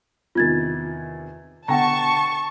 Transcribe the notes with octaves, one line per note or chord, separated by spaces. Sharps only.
E2 C3 D#3 F4 G#6 A6
B2 D3 F#5 G5 A5 A#5 C#6 A#6